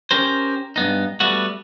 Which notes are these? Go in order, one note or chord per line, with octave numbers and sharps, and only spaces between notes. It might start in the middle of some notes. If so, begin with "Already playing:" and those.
C#4 G4 A#4 C5
G2 B3 D#4
G3 A3 B3 F#4